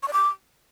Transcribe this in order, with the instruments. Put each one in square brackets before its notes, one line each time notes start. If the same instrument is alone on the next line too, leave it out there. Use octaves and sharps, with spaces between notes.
[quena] C#6
D5
D6